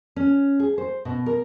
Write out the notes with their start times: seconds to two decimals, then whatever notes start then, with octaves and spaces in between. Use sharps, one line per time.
0.16 C#4
0.59 G#4
0.78 C5
1.05 B2
1.26 A#4